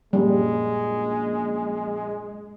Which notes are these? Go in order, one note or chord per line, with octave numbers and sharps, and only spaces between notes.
A#1 F#2 A#2 G3 G#3